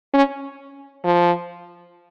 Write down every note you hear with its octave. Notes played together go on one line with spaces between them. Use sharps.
C#4
F3